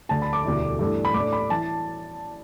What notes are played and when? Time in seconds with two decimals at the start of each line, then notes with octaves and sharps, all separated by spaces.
0.09 D2 D3 A3 A5
0.22 B5
0.33 D6
0.45 E1 D2 D3 G3 E4
0.79 G2 E3 A3 D4
1.05 B5
1.14 A2 A3 D4 D6
1.33 B5
1.50 E3 A5